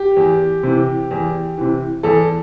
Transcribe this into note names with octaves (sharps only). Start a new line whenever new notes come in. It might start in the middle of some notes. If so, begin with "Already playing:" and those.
Already playing: G4
E2
C3 E3
E2
C3 E3
E2 A4